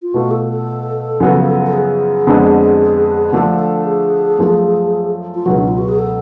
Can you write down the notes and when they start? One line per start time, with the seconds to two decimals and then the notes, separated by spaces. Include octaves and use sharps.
0.02 F4
0.14 B2 A3 F4 F#4
0.31 A4
0.49 A4
1.20 F#2 C#3 F3 B3 F#4
1.67 A4
1.73 G#4
2.27 F2 D3 G#3 B3 D4
3.32 D3 F3 A3 D4 A4
3.59 A4
3.86 G#4
4.39 F#2 F3 A3
5.35 F4
5.46 C#2 B2 F#3 F#4
5.58 D4
5.68 F4
5.78 F#4
5.89 G#4
5.99 A4